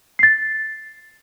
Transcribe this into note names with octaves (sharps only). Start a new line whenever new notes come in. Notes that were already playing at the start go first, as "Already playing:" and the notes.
A6 C7